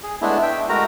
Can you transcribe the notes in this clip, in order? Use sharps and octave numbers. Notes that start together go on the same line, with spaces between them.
G#4
G#3 A3 B3 D4 E4
E5 G5
G#3 A3 F#4 A#4 A#5